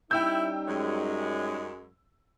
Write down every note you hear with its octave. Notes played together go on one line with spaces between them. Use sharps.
G3 C#4 D#4 E4 G5 E6 G6
F#2 G#3